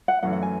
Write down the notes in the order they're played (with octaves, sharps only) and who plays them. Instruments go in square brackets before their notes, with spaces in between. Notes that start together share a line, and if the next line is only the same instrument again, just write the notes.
[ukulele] F#5
[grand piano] F#2 E3 A3 C#4 [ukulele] F#5
[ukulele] F#5
G#5